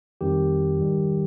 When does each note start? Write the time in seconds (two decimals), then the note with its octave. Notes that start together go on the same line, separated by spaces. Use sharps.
0.21 F2 D#3 G3 G4
0.79 G#2 D#3 G3